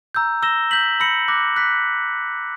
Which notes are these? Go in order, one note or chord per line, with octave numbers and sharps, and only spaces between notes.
A#5 E6 G6
E6 A#6 E7 G7
G6 B6 F#7
B5 E6 A#6 C#7 F#7
D6 F#6 A#6
F#6 B6